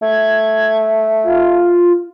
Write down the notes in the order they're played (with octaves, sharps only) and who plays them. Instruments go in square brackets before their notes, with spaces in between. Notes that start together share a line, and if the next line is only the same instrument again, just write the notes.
[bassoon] A3 [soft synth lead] G#6
[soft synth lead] F4